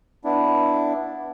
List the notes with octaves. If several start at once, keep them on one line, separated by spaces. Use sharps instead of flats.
B3 D4 E4